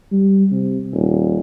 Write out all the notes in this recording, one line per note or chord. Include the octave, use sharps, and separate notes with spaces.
G3
C3
D#1